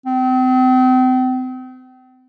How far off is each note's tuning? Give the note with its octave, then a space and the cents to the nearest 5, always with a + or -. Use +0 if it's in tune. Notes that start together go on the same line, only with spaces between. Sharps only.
C4 -35